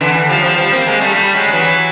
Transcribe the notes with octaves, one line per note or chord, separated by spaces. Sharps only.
D3 E3
D3 E3
F3 G3
F#3
F3 G3
F3 G3
A#3 C4
G#3 A#3
G3 A3
G3 A3
F#3 G#3
G3
E3 F#3